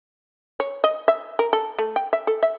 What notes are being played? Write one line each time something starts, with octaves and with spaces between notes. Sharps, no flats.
C#5
D#5
E5
A#4
A4
A3
G5
E5
A4
E5